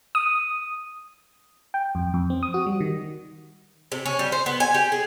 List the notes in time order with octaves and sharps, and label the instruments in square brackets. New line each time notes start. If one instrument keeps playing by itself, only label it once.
[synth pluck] D#6
[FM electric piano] G5
F2
F2
C4
D#6
F#4
G3
D#3
[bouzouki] C3
C#4
G3
C5
B3
G#5
G4
G#4